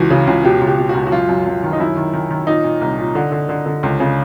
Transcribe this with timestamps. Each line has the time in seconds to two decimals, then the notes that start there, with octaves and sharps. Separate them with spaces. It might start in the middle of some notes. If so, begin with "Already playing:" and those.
Already playing: C#2 E3 F#4
0.10 C#3
0.27 C#2
0.44 B2 G4
0.61 C#2
0.67 G4
0.78 B2
0.89 F#4
0.95 C#2
1.07 F#4
1.12 F#2 F4
1.29 F#2
1.46 F#2
1.63 D#3
1.73 D#4
1.80 F#2 E4
1.97 D#3
2.14 D#3
2.30 D#3
2.47 A#2 D#4
2.64 A#2
2.81 C2
2.98 A#2
3.15 D3
3.32 D3
3.49 D3
3.66 D3
3.83 C#2
4.00 C#3